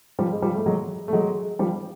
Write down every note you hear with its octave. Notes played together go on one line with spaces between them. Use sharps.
F3 G3
G#3
F3 G3
A3
F#3 G#3
A3
F#3 G#3
F3 G3